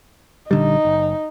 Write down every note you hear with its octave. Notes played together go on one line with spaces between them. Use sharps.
A#1 D3 G3 D#4
F#1